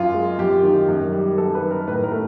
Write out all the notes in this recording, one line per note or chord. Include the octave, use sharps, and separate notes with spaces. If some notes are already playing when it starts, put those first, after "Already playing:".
Already playing: F#2 F4
G#3
F#2 G4
D#3
F#2
G3
F#2 A4
B4
D#3
A#4
A2 B4
A#4
A3